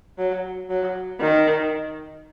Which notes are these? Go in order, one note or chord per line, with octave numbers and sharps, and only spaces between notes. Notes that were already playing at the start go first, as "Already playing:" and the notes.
F#3
F#3
D#3